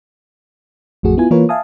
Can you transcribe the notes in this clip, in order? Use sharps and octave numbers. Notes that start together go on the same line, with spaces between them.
A1 F2 A3 F#4 G#4
B3 E4 F4 G#5
E3 A#3 F4 A#4 B4 C#5
E5 F5 G#5 A5 D#6